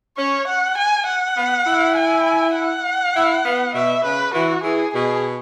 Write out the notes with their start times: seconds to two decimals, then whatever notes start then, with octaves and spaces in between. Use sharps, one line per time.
0.17 C#4 C#5
0.47 F#5
0.77 G#5
1.07 F#5
1.37 B3
1.67 E4
1.96 G#5
2.55 F#5
3.16 E4
3.46 B3
3.74 B2 E5
4.04 C#3 B4
4.34 E3 F#4
4.64 E3 G#4
4.94 B2 G#4